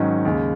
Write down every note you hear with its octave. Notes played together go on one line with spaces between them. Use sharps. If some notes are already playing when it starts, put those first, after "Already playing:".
Already playing: G#2 D#3 F#3 C#4
D#2 C#3 G#3